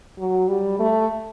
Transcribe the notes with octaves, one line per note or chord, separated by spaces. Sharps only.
F#3
G3
A3